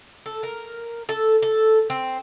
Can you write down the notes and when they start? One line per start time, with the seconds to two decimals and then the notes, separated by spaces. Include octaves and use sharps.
0.26 A4
0.43 A#4
1.09 A4
1.42 A4
1.90 C4